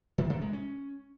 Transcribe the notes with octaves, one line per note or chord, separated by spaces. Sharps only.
D#3
C3
G#3
C#4